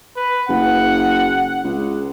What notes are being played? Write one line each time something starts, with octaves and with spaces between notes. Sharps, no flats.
B4
F#1 F#5
C#2